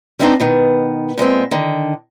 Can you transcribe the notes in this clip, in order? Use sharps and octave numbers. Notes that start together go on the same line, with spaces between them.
G3 G#3 B3 C4 D4 D#4
B2 D#3 B3
A#2 G#3 B3 C4
D3 D#3